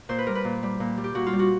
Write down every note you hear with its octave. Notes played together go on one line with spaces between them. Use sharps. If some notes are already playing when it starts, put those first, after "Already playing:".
A#2 C5
B4
G3 A#4
B4
A#2
G3
A#2
G3
G4
A#2 F#4
F4
G3
F#4